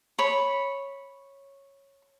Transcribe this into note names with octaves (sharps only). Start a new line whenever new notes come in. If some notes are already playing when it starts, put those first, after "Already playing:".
C#5 B5